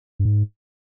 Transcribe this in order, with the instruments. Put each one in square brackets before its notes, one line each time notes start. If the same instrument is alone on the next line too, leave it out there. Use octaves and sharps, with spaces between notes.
[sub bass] G2
G#2